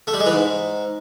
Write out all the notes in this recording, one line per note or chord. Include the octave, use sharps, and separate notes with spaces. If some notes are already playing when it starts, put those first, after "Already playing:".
A3
G3
G#3
E3
G#2